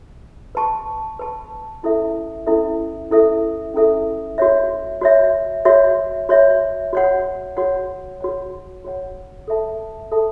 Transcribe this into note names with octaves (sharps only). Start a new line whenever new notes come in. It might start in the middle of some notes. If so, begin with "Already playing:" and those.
B4 A5 C#6
B4 A5 C#6
C#4 E4 A4 E5
C#4 E4 A4 E5
C#4 E4 A4 E5
C#4 E4 A4 E5
F#4 C#5 E5
F#4 C#5 E5
F#4 C#5 E5
F#4 C#5 E5
F#4 C#5 F#5
F#4 C#5 F#5
F#4 C#5 F#5
F#4 C#5 F#5
A4 E5 A5
A4 E5 A5